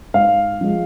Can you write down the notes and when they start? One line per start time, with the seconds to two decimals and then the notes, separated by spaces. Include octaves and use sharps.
0.14 G#2 F5
0.61 F3 G#3